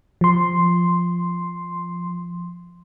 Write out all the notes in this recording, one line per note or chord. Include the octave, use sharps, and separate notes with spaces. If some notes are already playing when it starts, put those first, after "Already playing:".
F3 C6